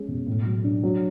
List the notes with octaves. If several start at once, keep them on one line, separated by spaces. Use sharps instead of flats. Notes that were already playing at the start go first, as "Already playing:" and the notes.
Already playing: G#3 C#4
B2
A2
F#3
D4
F#3